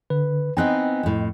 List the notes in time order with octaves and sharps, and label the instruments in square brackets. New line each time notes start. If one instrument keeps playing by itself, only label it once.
[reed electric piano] D3 [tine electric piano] B4
[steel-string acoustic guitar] B3 C4 D#4 [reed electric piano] D#5 G5 [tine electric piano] G#5 F#6
[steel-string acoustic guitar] F2 A2